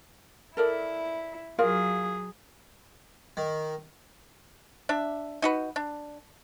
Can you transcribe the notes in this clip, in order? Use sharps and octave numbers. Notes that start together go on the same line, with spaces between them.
E4 A4 A#4 D5
F#3 F4 G#4 A#4 F5
D#3
D4 E5
D#4 F#4 B4
D4